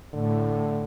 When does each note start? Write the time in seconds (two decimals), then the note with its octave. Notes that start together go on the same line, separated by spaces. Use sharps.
0.12 A2 D3